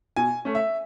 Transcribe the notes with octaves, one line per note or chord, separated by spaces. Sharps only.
B2 G#5
A3 C#4
E5